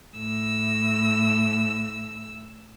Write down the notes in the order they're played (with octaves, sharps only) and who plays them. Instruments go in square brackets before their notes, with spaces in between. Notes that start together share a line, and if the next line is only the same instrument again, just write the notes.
[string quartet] A2 E6